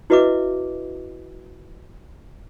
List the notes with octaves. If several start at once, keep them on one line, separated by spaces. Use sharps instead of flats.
E4 F#4 B4 D#5 E5 D6